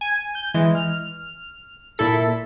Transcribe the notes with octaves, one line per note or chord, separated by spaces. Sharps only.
G#5
G6
E3 G#3
F6
A#2 E4 A4 B6